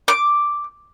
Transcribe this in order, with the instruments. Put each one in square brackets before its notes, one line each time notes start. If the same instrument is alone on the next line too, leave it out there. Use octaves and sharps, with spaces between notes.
[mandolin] D6